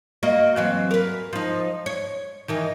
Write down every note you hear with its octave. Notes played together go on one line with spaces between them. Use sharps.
A#3 F#4 D#5
E3 F#3 C4
A#4 B4
F3 D#4
C#5
D#3 E3 D#4